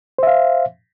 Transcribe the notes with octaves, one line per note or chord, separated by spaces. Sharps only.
C5 E5 F5